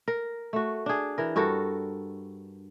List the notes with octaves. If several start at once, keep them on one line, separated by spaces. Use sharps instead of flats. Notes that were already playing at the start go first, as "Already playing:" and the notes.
A#4
A3 F#4
D4 G#4
E3 A#4
G2 F#4 A4 A#4